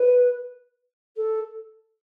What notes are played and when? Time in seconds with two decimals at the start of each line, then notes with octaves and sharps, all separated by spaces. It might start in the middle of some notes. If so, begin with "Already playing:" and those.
Already playing: B4
1.16 A4